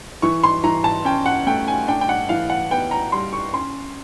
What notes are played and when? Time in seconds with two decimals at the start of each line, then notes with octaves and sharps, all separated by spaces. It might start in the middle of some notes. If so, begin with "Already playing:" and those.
0.22 E3 C#6
0.43 C6
0.64 E3 A#5
0.84 A5
1.05 C#4 G5
1.26 F#5
1.46 A3 G5
1.68 G#5
1.87 D4 G5
2.01 G5
2.09 F#5
2.29 E3 F5
2.50 F#5
2.71 B3 G5
2.91 A#5
3.12 G3 C6
3.33 C#6
3.53 C#4 C6